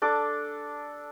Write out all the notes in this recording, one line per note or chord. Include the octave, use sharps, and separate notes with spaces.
D4 A4 D6